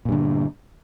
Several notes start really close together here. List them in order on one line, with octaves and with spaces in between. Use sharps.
A#2 G2 D3